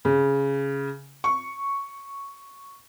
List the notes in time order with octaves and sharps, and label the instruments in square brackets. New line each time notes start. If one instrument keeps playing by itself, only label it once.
[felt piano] C#3
C#6